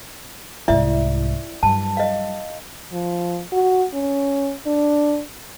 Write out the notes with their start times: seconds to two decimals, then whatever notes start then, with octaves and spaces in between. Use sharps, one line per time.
0.68 C2 G#2 E4 D5 E5
1.63 G2 F#3 A5
1.97 D#5 F5
2.93 F3
3.52 F#4
3.94 C#4
4.66 D4